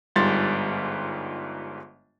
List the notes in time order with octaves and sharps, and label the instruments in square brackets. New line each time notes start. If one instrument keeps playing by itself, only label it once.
[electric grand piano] G1 G#2 G3 F4 C6 A6